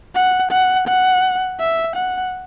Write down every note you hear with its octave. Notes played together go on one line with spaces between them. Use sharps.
F#5
F#5
F#5
E5
F#5